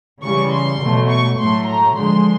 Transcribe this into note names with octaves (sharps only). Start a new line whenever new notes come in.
C#3 E3 G3 C#6
C6
B2 F#3 A3
C#6
A2 F#3 A3 C6
A#5
D3 F3 G#3 C6